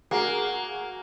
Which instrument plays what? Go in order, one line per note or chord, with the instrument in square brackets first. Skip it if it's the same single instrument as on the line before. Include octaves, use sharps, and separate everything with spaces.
[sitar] A#3 [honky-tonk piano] F#4 G#4